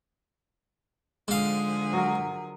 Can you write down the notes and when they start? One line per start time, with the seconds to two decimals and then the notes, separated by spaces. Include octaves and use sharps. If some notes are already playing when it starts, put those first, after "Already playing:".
1.28 G#2 D3 F3 G#4 F5
1.93 F#3 A#4